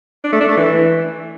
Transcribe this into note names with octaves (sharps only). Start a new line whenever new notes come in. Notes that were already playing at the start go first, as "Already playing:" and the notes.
D4
A3
D4
A3
E3